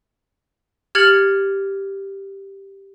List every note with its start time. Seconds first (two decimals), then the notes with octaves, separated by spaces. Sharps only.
0.95 G4 F6 G#6 A6 C#7 F#7